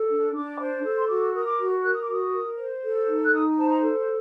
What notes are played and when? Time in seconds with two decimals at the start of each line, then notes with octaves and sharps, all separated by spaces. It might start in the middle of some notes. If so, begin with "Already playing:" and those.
Already playing: A4
0.09 D4
0.34 D4 D6
0.59 C5
0.83 A4
0.97 C6
1.09 F#4 D6
1.33 A#4 D#6
1.46 D6
1.58 F#4
1.83 A#4 F#6
1.93 D#6
2.02 D6
2.08 F#4 D#6
2.33 A#4
2.57 C5
2.82 A4
3.07 D#4
3.23 F#6
3.31 D#4 D#6
3.57 C5 A5
3.69 A#5
3.81 A4